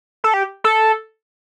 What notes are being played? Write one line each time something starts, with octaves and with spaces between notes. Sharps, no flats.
A4
G4
A4